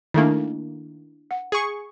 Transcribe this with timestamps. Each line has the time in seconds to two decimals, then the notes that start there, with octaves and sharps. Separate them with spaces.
0.14 D#3 A3 A#3 D4 E4
1.31 F#5
1.52 G#4 C#6